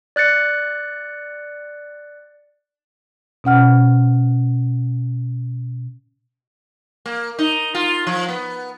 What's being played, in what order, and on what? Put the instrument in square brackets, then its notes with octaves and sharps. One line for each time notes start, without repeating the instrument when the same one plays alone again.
[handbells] D5 F#6 A6 C#7
[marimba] B2 C#4 F#5 F6
[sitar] A#3
D#4
F4
F3
B3